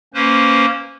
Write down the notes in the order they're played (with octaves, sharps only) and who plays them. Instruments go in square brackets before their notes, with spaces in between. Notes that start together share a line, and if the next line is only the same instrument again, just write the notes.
[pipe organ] A#3 C#4 B4 C5